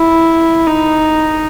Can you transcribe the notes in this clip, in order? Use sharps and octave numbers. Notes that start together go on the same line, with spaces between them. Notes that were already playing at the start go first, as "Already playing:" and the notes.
Already playing: E4
D#4